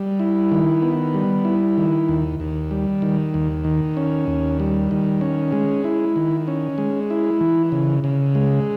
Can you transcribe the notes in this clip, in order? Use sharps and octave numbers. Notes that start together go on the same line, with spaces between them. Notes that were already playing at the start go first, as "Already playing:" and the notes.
Already playing: G3
E4
D#3
B3
G3
E4
D#3
D#2
D#2
G3
D#3
D#2
D#3
C#4
D#2
G3
D#3
C#4
G#3
E4
D#3
C#4
G#3
E4
E3
C#3
C#3
G#3